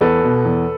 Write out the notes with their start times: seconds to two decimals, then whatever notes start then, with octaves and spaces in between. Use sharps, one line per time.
0.01 E2 A4 B4
0.24 B2
0.45 E2